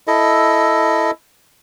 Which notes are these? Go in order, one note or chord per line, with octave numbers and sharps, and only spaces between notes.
E4 A4 D#5